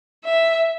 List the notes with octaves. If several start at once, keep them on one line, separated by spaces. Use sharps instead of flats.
E5